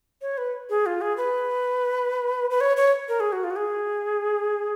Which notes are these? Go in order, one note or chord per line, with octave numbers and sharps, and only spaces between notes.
C#5
B4
G#4
F4
G#4
B4
B4
C#5
C#5
A#4
G#4
F#4
F4
F#4
G#4